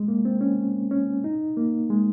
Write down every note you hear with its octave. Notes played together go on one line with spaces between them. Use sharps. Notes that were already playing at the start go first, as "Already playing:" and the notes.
Already playing: G#3
A#3
C4
C#4
C#4
D#4
A#3
G#3